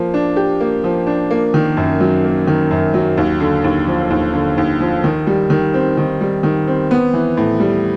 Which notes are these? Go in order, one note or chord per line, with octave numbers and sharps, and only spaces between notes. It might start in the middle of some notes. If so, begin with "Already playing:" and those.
Already playing: F3 A#3
D4
G4
A#3
F3
D4
A#3
D#3
F#2
F#3
A#3
D#3
F#2
F#3
D#2
D3
D#2
F3
D#2
D3
D#2
F3
D#3
G3
D#3
C4
D#3
G3
D#3
C4
B3
E3
A2
G3